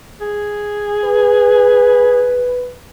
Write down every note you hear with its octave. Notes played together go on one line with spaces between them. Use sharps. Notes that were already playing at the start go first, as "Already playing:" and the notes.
G#4
B4